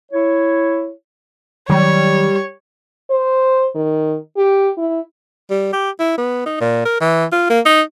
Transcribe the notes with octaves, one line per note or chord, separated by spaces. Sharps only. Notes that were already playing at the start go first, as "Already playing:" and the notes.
E4 C#5
D#3 F#3 G3 C#5
C5
D#3
G4
E4
G3
G4
E4
B3
D#4
A#2
A#4
E3
F4
A#3
D#4